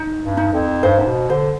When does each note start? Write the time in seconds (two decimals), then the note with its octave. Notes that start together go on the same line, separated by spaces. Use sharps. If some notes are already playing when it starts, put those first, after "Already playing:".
Already playing: D#4
0.23 G2
0.37 D#4
0.53 F2
0.83 G2 C5
0.99 G#2
1.07 B2
1.30 D3 C5